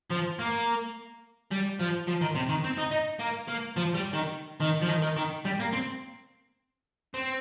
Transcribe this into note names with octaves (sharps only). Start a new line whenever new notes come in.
F3
A#3
G3
F3
F3
D#3
C3
D#3
C4
D#4
D#4
A#3
A#3
F3
G3
D#3
D#3
F3
D#3
D#3
D#3
G3
A#3
C4
C4